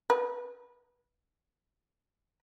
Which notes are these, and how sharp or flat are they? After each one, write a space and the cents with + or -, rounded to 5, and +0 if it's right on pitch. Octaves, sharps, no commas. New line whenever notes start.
B4 -20